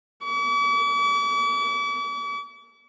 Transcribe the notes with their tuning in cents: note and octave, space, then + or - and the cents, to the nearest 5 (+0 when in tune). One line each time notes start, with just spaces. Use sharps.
D6 -45